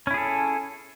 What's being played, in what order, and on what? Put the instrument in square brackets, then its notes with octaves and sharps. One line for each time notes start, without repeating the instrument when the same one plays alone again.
[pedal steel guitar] C#4
E4
G#4
A4